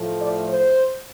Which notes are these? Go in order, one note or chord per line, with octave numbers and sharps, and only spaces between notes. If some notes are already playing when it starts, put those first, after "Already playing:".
Already playing: A2 F3 A3
D5
C5